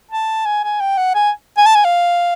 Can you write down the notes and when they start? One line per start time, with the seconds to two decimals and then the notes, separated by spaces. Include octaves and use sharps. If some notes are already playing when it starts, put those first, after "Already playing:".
0.11 A5
0.45 G#5
0.64 G#5
0.80 G5
0.97 F#5
1.15 G#5
1.57 G#5
1.66 A5
1.75 G#5
1.84 F5